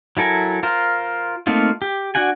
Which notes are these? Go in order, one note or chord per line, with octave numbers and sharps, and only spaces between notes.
F#3 E4 A4 A#4 G#5
F4 A#4 C5
A3 A#3 C4 D#4 F4
G4
D4 F#4 F#5 G#5